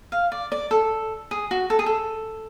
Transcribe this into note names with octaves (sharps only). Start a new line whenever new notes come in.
F5
D5
D5
A4
G#4
F#4
A4
G#4
A4